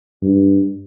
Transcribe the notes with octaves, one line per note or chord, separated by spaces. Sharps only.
G2